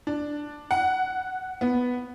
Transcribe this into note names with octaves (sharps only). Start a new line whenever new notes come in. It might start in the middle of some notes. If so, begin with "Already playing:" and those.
D4
F#5
B3